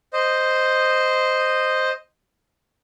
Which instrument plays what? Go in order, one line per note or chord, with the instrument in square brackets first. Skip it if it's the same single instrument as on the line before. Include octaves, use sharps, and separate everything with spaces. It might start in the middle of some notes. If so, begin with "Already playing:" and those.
[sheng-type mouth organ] C5 D#5